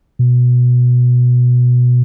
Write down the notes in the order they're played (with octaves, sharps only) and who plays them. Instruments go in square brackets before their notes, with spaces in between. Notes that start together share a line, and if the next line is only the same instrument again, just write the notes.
[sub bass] B2